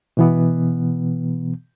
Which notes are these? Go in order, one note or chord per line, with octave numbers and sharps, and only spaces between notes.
B2 E3 B3